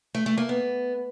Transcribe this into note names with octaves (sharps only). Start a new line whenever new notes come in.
A3
A3
A#3
B3